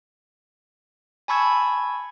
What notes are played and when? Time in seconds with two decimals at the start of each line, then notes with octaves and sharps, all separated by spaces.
1.28 G#5 A5 B5 C#6 E6 G#6